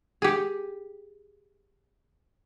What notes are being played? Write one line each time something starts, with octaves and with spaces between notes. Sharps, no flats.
G4 G#4